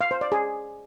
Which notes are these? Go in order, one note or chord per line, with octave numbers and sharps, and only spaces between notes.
F5
C5
D5
G#4